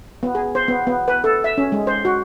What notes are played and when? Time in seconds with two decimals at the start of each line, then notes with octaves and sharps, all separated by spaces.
0.23 B3
0.35 G#4
0.55 C5
0.68 B3
0.87 B3
1.08 B4
1.24 A4
1.44 E5
1.58 C#4
1.72 G#3
1.87 C5
2.05 F#4